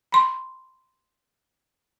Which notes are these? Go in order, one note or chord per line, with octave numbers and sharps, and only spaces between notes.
B5 C6